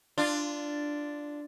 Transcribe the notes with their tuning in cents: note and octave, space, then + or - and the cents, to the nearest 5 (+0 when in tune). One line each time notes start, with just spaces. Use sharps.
D4 +0 F4 -15